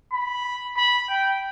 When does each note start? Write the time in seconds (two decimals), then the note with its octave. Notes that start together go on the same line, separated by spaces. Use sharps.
0.13 B5
0.77 B5
1.09 G5